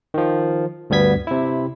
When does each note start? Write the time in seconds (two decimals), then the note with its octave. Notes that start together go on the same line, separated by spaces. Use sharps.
0.14 D#3 F3
0.90 D2 G2 G3 B3 G#6 B6
1.27 C3 E4